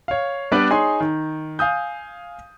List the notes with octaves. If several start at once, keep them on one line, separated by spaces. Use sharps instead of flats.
C#5 F5
G3 B3 D4 B4 D5
D#4 G#4 C#5 G#5 C6
D#3
F5 G#5 D#6 G6